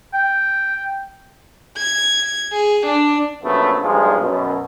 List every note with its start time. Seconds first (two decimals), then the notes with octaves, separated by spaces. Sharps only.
0.14 G5
1.77 G#6
2.52 G#4
2.86 D4
3.44 A#1 F#2 A3 B3
3.82 B1 G2 A#2 F3 G#3
4.22 F#2 B2